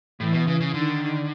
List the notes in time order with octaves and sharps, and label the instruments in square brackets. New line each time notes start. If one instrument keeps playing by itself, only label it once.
[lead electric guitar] A2 [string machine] E3
[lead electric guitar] B2
C#3
C#3
[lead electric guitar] D3 [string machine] D#3